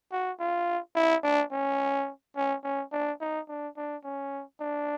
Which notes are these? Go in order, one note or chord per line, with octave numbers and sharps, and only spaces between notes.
F#4
F4
E4
D4
C#4
C#4
C#4
D4
D#4
D4
D4
C#4
D4